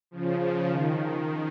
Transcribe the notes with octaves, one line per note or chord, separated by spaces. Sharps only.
C#3 F3
C#3 F3
D#3